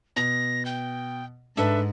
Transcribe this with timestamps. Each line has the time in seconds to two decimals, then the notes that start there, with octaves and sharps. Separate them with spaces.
0.16 B2 A#6
0.65 G5
1.57 G#2 D4 A4 B4 E5